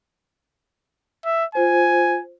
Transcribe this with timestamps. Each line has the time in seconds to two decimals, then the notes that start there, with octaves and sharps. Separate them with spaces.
1.25 E5
1.55 F4 C5 G#5